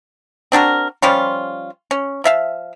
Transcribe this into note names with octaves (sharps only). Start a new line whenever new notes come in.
C4 D4 F#4 A#4
F3 G3 C#4 F4
C#4
F3 E5 F5